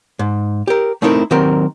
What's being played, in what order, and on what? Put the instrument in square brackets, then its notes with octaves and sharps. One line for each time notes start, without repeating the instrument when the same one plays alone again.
[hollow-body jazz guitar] G#2
G4 A#4
A3 C4 D#4 E4 A#4
D#3 F#3 C4 G4 A#4